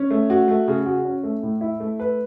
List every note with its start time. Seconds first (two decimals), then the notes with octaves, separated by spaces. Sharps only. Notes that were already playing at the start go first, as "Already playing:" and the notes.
Already playing: C#4
0.10 A3
0.30 F#4
0.48 A3
0.68 C#3
0.86 F#4
1.05 C#4
1.23 A3
1.43 A2
1.61 E4
1.80 A3
2.00 B4